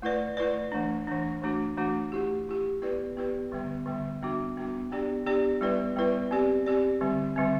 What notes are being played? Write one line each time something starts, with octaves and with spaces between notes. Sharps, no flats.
A3 E4 B4 D5
A3 E4 B4 D5
E3 A3 D4
E3 A3 D4
E3 A3 D4 F#4
E3 A3 D4 F#4
A3 E4 G4
A3 E4 G4
B3 E4 G4 B4 D5
B3 E4 G4 B4 D5
D3 G3 B3
D3 G3 B3
G3 B3 D4 F#4
G3 B3 D4 F#4
B3 D4 G4 D5
B3 D4 G4 D5
G3 B3 E4 B4 D5
G3 B3 E4 B4 D5
C4 G4 D5
C4 G4 D5
D3 G3 C4
D3 G3 C4